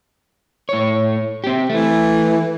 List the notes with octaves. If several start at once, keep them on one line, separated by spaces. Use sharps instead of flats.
A2 C#5
C4 G4
E3 A3